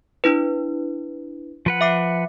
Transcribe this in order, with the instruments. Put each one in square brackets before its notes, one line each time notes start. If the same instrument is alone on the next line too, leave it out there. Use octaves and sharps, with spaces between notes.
[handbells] D4 E4 B4
[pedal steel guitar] F3 B4 F#5
[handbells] E5 D6 C7